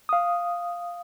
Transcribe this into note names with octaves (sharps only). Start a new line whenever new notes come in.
F5 D#6